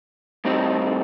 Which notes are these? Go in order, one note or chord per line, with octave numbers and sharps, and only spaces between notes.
A2 G3 C4 D#4